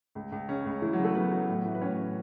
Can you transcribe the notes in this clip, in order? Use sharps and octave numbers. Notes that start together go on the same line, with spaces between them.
C#2
C#2
C#3 C#4
C#2
C#2 E3 E4
F#3 F#4
C#3
A3 A4
F#3 B3 B4
F#3
A2
E3
B4
A2 C#4 C#5
A2